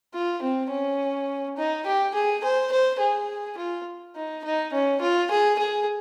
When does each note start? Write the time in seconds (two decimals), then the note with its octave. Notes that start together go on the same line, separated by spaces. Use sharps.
0.14 F4
0.42 C4
0.70 C#4
1.57 D#4
1.86 G4
2.14 G#4
2.44 C5
2.72 C5
3.00 G#4
3.58 F4
4.16 D#4
4.44 D#4
4.73 C#4
5.01 F4
5.31 G#4
5.59 G#4